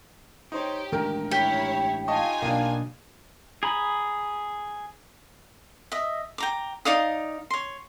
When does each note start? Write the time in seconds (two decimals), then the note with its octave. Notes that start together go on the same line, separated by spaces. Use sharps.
0.52 D#4 G4 C5 C#5
0.92 A1 D#3 G#3 D4 A#4 G5
1.31 E4 G4 C#5
2.08 D#4 F4 D#5 G#5 A5 C#6
2.42 B1 B2 A#3 D4
3.63 G#4 A#5 B5
5.92 D#5 E5
6.38 G5 A#5 D6
6.85 D#4 D5 F5 D#6
7.50 C#5 C6